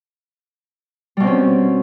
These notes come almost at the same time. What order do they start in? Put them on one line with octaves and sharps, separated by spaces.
G3 B2 C4 C#4